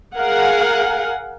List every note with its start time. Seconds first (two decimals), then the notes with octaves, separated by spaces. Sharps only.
0.16 G#4 A#4 F5 F#5 G#5